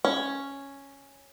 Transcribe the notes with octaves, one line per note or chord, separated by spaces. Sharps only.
C#4